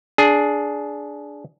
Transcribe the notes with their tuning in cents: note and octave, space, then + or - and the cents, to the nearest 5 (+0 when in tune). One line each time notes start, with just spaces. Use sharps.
D4 -5 G#4 +10